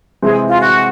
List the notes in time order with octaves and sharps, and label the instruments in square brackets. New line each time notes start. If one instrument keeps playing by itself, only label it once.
[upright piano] C3 E3 G#3 C4 [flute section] G#4
[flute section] F4
F#4